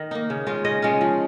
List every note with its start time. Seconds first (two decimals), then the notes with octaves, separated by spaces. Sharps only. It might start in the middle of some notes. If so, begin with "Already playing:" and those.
Already playing: D#3 D#5
0.11 A#3 D#4
0.30 C#3
0.47 G#3 C#4 F4
0.65 C#3 D#5
0.82 G#3 C#4 F4
1.01 F3